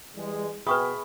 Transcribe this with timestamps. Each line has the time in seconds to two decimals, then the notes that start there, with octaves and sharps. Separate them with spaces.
0.16 E3 G3 G#3
0.67 B2 G#4 B4 E5 G5 B5 C#6 D#6